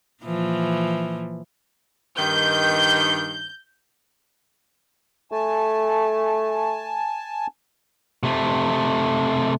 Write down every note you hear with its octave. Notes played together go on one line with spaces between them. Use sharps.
A#2 E3 F3
G2 D#3 G6
A3 G#5 A5
C3 A3